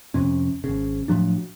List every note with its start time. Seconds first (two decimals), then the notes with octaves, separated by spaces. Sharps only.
0.14 F2 C3 C#4
0.64 G#1 C#3
1.08 A2 F3 F#3 D4